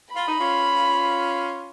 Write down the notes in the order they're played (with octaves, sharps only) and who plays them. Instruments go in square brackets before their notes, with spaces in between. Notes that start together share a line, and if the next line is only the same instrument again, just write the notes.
[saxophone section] F4 [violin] B5
[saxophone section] D#4
C#4 F4